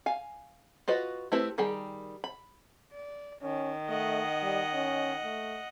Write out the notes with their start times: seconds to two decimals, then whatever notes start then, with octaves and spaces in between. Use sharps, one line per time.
0.06 F5 G#5
0.88 F4 F#4 B4 D#5
1.32 A3 C4 E4 G4 B4
1.58 D#3 G3 G#4 G5
2.24 B5
2.93 D5
3.42 D#3 C#4
3.89 A3 D#5 F#5
4.43 G3
4.73 C#4
5.24 A3